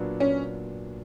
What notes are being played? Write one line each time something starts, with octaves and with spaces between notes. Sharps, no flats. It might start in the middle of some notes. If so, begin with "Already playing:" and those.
Already playing: A#2 F#3 B3 D4
C#4